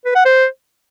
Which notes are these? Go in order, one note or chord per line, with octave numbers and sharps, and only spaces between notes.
B4
F#5
C5